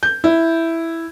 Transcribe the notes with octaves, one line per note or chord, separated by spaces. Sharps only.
G6
E4